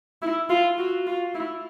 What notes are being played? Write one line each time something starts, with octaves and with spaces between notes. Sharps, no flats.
E4
F4
F#4
F4
E4